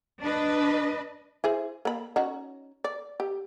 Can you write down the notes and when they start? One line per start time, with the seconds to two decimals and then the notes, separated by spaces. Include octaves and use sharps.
0.22 D4 B4 D#5
1.44 E4 G#4 C5
1.85 A#3 B5
2.16 C#4 D#4 F#4
2.84 D5
3.20 G4